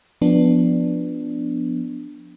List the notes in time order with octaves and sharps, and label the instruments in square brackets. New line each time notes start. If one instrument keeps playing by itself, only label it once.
[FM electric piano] F3 B3 D4